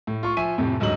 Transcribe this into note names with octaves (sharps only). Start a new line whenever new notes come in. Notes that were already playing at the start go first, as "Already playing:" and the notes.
A2
F4 C#6
F3 E5 G#5 D#7
F2 A2 C3
D2 G#2 F#3 D#5 F#7